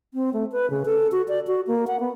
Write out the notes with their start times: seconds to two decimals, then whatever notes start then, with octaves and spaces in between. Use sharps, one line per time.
0.14 C4
0.33 A3
0.52 B4
0.70 C#3
0.86 A4
1.12 F#4
1.28 D5
1.47 F#4
1.67 A#3
1.87 F#5
2.00 B3